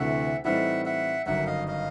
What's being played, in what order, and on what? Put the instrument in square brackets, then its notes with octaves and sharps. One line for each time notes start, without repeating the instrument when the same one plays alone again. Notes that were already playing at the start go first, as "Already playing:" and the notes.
Already playing: [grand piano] D2 C3 E3 A3 D4 [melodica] E5 F#5
[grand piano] A2 E3 G3 C4 D#4 [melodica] E5 F#5
[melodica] E5 F#5
[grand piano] G1 F#2 D#3 [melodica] E5 F#5
[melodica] D#5 F5
D#5 F5